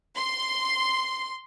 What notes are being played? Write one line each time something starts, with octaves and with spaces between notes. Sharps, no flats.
C6